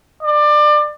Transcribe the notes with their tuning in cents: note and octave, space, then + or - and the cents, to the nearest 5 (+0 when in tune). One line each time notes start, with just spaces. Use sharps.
D5 +25